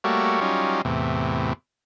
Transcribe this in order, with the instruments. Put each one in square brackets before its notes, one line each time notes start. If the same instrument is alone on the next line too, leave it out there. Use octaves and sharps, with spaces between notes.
[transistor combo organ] G3 A3 A#3 F#4 C#5
F#3 G3 C#4 D#4 F4
E2 A2 C3